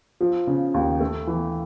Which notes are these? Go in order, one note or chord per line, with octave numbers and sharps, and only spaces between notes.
F3
C#3
D#2
A3
E3